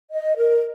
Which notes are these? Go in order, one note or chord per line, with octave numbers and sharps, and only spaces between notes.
D#5
A#4